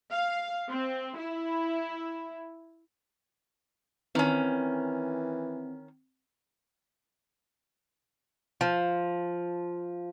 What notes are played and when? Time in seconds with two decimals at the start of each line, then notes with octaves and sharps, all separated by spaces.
0.11 F5
0.69 C4
1.17 E4
4.15 D#3 E3 C4 C#4
8.61 F3